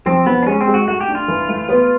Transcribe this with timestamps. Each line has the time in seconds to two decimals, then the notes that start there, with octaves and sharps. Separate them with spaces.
0.06 F3 C4
0.26 F3 B3
0.43 D4
0.47 G#3 C#4
0.61 C4
0.67 G#3
0.74 F#4
0.88 A3 F#4
1.01 G4
1.08 D4
1.15 F4
1.28 E3
1.48 A3
1.69 B3